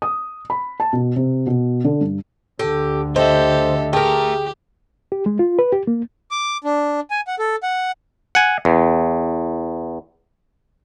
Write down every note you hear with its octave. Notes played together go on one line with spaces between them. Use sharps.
D#6
B5
A5
B2
C3
B2
D3
G2
D2 D3 G4 A4
G4 A4 C5 D#5 E5
A3 G4 G#4 A#4 G5
G4
G#3
F4
B4
G4
A#3
D6
D4
G#5
F#5
A4
F#5
F#5 G#5
E2